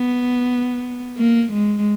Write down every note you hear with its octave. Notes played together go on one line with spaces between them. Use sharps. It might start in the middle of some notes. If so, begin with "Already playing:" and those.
Already playing: B3
A#3
G#3